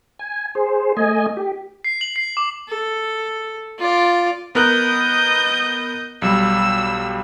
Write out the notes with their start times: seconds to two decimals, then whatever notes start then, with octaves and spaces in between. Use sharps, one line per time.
0.19 G#5
0.55 G#4 C5
0.97 A3 D#5 G#5
1.37 G4
1.84 C7
2.01 F#7
2.16 C7
2.37 D6
2.69 A4
3.78 F4 D5
4.55 B3 A#4 D#5 F#6 G6
6.22 B1 F#3 G3 E6